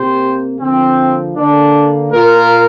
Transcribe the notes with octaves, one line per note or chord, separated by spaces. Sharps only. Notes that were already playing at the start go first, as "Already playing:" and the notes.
Already playing: C3 A#3 G4 C5
D3 F3 A#3 C4
D3 A#3 D4
A#2 A#3 F4 A#4